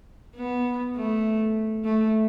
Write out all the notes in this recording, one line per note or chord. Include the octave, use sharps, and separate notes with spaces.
B3
A3
A3